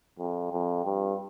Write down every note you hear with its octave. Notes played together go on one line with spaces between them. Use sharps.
F2
F2
G2